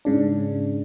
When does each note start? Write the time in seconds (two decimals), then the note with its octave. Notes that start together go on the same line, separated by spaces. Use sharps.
0.05 G#2 C#3 D4